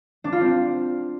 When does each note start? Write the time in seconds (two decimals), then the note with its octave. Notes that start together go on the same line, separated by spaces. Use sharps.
0.24 D4
0.32 F4
0.41 C4